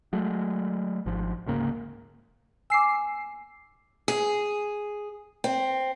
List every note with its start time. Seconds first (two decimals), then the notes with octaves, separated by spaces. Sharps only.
0.13 F#3 G#3 A3
1.06 G#1 G#2 F3
1.46 D2 G#2 C#3 A#3
2.70 G#5 D6 E6 C7
4.08 G#4
5.44 C4